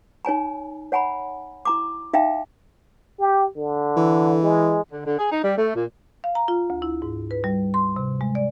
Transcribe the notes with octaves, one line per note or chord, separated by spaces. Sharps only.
D#4 C#5 G#5 A#5
C#5 F#5 G#5 A#5 B5
E4 A#5 D6
D#4 E5 F5 G5 A#5
G4
D3
E3
G#3
D3
D3
G#4
D#4
G3
A3
A#2
F5
A#5
F4
D2
E4
G#2
B4
G3
C6
C3
G#3
D5